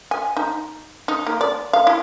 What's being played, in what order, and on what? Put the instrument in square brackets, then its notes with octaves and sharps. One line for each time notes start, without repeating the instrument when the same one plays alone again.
[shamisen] G#5
D#4
D#4
A#3
D5
F5
E4